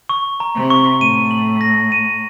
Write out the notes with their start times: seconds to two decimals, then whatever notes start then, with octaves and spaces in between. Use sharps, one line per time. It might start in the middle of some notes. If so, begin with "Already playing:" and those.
0.09 C#6
0.40 A#5
0.56 C3
0.70 C#6
1.00 A2 D#7
1.31 F#7
1.61 A#6
1.92 D#7